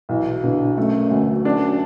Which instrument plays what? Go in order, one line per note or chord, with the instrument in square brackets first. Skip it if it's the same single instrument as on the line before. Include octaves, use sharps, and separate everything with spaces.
[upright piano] B1 [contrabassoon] E3
[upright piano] B2 [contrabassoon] D3
[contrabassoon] F#2 [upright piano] A3
[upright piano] D2
[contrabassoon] F#2 [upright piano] D4